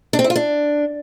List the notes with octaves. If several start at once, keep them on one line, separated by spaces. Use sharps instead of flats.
D4
C4
E4
F4
D4